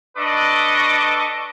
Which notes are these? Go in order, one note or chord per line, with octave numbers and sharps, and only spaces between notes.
D4 A4 B4 D#5 C#6 D6